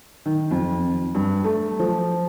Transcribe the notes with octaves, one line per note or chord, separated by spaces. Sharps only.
D#3
F2
G2
A3
F3